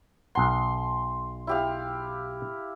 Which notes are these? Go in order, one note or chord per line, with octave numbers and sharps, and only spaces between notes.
B1 F#5 C6
E4 G4 F5